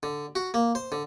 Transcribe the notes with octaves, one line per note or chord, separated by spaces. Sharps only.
D3
F#4
A#3
C5
D3